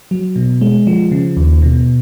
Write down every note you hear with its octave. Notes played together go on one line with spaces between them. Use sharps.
F#3
B2
G#3
F3
C#3
D#2
B2